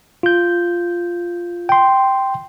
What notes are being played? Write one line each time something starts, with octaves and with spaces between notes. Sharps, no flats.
F4 G6
G5 C6